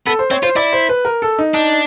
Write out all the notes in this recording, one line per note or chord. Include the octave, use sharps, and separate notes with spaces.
B3 A4
C5
C4 C#5
F4 C5
E4 D5
C5
B4
A#4
A4
D#4
D4 D#4